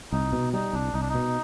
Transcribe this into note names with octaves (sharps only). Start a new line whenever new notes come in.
C2 D#4
B2
G3 D#4
C2 D4
C2 D#4
D4
D#4
B2